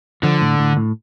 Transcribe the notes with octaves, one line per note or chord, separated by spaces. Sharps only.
D3 F3
A2
A2
A2